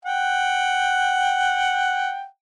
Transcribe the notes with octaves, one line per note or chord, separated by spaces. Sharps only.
F#5 G5